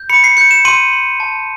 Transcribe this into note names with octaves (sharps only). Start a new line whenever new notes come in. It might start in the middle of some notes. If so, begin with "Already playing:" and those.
Already playing: G6
B5 C#7
C7
G6 C#7
E7
C6 D#7
C6
A5